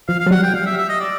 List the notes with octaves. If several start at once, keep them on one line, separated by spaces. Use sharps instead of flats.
F3 F5
F5
F#3
G3 F#5
G5
G3 F5
E5
E5
D#5
D5